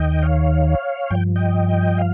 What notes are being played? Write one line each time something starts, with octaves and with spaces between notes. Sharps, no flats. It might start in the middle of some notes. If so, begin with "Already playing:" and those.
Already playing: D#2 D#3 D#5 G5
C#5 F5
G2 F3 G5
D#5 G5
F5